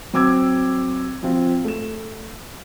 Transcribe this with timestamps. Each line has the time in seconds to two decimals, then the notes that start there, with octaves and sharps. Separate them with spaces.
0.14 F#3 C4 D6 E6 G#6
1.23 F3 C4 F4
1.65 A3 E7